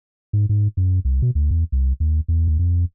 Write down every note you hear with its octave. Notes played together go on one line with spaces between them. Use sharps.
G#2
G#2
F#2
C2
B2
D2
E2
C2
D#2
E2
D#2
F2